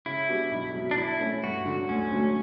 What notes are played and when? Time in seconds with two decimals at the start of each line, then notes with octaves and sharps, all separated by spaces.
0.06 C#3 E4
0.29 G3 B3 D4 F#4
0.52 B1
0.75 B2 F#3
0.91 D4
0.97 E3 E4
1.20 A3 C#4
1.43 G2 F#4
1.66 D3 F#3
1.89 D2 C#4
2.12 D3 F#3 A3